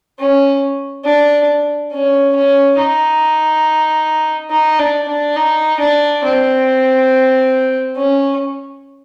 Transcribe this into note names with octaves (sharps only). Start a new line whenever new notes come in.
C#4
D4
C#4
C#4
D#4
D#4
D4
D4
D#4
D4
C4
C#4